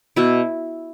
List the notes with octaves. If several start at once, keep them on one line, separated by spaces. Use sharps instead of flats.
B2 E4